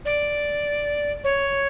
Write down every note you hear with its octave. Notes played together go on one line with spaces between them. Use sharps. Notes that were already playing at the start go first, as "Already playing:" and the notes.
D5
C#5